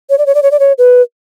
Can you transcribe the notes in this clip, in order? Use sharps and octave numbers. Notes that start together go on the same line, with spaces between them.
C#5
D5
C#5
D5
C#5
D5
C#5
B4